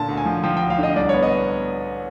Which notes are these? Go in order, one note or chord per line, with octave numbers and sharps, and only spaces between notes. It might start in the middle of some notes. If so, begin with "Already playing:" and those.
Already playing: A#2 D3 A5
D2
G#5
F3
F3 G5
D2 G5
F5
D3 D#5
C2 D5
B3 C#5
D#5